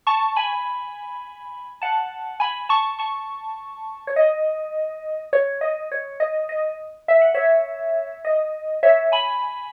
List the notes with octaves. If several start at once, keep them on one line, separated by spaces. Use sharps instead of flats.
A5 C#6
G#5 B5
F#5 A5
G#5 B5
A5 C#6
A5 C#6
C#5
D#5
C#5
D#5
C#5
D#5
D#5
E5
F#5
C#5 E5
D#5
C#5 E5
G#5 B5